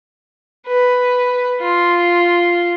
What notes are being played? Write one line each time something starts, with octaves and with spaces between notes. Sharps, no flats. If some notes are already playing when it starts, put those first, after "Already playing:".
B4
F4